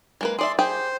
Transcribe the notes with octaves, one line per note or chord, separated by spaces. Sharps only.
G#3 A#3 B4
G#4 D5 E5 C6
G4 G#4 C5 G5